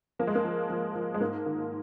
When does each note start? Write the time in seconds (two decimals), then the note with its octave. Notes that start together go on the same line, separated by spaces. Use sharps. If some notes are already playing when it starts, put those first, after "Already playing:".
0.19 F3 A#3
0.27 G#3
0.35 A#3
0.45 F3
0.70 F3
0.95 F3
1.14 G#3
1.20 G#2 A#3
1.46 D#3